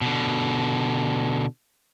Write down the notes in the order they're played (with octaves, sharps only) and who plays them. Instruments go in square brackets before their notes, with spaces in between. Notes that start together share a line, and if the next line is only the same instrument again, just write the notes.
[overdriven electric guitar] B2 D3